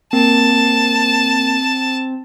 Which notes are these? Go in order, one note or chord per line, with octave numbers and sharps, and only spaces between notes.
A#3 C4 A5